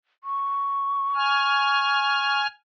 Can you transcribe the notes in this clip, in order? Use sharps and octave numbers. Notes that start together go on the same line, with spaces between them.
C#6
G#5 F6